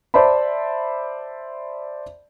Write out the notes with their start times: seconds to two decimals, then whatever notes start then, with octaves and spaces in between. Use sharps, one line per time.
0.14 C5 D5 E5 A5 B5